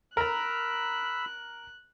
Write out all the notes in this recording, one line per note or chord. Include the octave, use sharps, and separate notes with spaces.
A#4 A#5 B5 E6 F#6